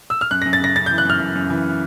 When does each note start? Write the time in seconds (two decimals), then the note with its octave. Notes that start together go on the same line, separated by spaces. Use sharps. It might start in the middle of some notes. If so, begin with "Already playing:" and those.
0.10 E6
0.21 F6
0.31 F#2 F#6
0.42 A#6
0.45 F#2
0.53 A6
0.60 C#3 A#6
0.76 C#3 A6
0.86 G6
0.91 E3
0.98 F#6
1.05 F#2 F6
1.20 F#2
1.35 F#2
1.50 E3